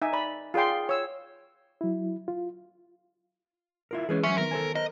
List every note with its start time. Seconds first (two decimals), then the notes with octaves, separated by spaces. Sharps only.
0.02 D#4 E5 G#5
0.13 D5 B5
0.54 F4 G#4 D5 G5 C6
0.89 C#5 E6
1.81 F#3 E4
2.28 F4
3.91 E4 F4 A#4
4.09 E3 G#3 C#4 G#4 B4 C#5
4.23 F#3 C#4 E5 C6 B6
4.38 D#3 B3 A#4
4.51 A4 C5 G#5
4.75 A#4 C5 D#5 A#5